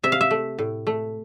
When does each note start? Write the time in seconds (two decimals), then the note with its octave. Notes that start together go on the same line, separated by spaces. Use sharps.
0.03 C3 E5
0.12 F5
0.21 E5
0.31 A3
0.59 A2
0.87 A3